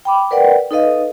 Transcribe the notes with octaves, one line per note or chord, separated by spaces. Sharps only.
G5 B5 D6
A#4 B4 D5 F#5 G5
D#4 A4 B4 D#5 F5